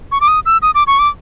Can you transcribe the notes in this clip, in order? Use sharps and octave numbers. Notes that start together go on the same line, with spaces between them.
C#6
D6
D#6
E6
D#6
D6
C#6
D6